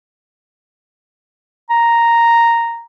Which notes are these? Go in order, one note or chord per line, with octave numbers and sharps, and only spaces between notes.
A#5